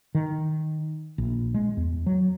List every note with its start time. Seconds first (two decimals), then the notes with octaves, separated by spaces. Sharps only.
0.15 D#3
1.18 A#1
1.54 G#3
1.77 E2
2.06 F#3